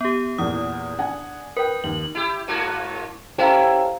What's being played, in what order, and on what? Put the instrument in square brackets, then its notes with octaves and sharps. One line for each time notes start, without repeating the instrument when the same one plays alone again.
[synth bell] B3 G4
[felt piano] E2 A#2 [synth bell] D#6
[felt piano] D4 F#5 G#5
[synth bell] A#4 [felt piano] B4 G5
[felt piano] D#2 [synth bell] F#7
[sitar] E4 G4
G#2 A#3 F#4
[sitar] C#4 E4 A4 [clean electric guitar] G4 [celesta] C5 F5 A#5